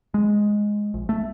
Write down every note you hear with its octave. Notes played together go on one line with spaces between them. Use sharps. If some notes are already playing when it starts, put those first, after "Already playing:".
G#3
A#1
A3